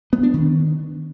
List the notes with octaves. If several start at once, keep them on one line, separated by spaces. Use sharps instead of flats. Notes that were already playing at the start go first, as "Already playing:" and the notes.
B3
D4
D#3